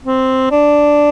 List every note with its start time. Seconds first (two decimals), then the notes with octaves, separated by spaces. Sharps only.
0.05 C4
0.51 D4